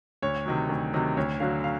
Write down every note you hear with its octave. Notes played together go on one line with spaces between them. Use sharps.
D2 C#5
C3 D#3 F#3
D2
C3 D#3 F#3
D2 C#5
D3 F#3 F5
F5